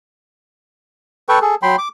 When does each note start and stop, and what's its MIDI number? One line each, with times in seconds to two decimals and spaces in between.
1.29 1.39 69
1.29 1.39 71
1.29 1.39 79
1.29 1.39 85
1.41 1.55 68
1.41 1.55 69
1.63 1.76 54
1.63 1.76 79
1.63 1.76 83
1.63 1.76 84
1.78 1.88 86